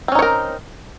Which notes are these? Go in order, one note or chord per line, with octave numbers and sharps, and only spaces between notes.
C4 C#4 D#4 A#4 C#5